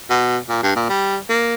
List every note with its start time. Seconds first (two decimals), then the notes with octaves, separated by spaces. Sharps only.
0.10 B2
0.49 A#2
0.63 G2
0.76 A#2
0.89 G3
1.29 A#3